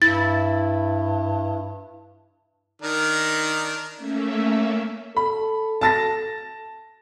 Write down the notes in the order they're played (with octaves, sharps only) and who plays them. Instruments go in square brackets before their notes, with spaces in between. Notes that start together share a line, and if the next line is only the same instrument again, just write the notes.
[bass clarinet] G2 [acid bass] E4 [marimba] A6
[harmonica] D#3 D4 A#4
[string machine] A3 A#3 C#4 E5
[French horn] A4 [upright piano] B5
[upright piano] A5 A6 A#6